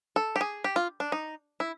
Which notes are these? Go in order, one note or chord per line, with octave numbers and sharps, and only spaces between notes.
A4
G4
G#4
G4
F4
D4
D#4
E4